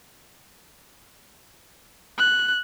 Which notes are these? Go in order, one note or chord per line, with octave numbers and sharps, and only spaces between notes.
F#6